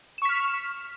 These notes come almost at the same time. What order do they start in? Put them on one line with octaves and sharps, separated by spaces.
E7 C#6 B6 F6